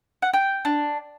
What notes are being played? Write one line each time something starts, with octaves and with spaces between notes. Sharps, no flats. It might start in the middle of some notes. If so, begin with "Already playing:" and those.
F#5
G5
D4